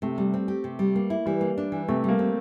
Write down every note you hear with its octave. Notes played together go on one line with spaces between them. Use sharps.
C3 A3
G3
C4
G4
C3
G3
A#3
E4
E3 G3
A#3
D4
E3
C3 A3
G3 A#3
C4